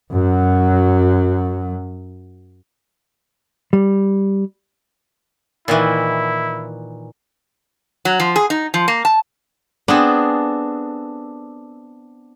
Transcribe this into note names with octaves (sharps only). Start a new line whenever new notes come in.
F#2 F#3
G3
A#2 D#3 E3 E4
F#3
F3
G#4
D#4
F3
A#3
A5
B3 C4 D4 G#4 A4